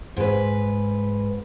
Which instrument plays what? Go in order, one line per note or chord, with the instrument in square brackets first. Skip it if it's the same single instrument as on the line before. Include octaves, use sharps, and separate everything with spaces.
[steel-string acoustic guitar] G#2 B4